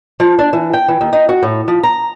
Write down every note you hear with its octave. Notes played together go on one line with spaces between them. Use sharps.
F3
D4
E3
G5
E3
D#2
D#4
F#4
A2
F3
A#5